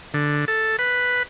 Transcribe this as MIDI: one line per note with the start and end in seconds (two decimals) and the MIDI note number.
0.14 0.45 50
0.48 0.76 69
0.79 1.23 71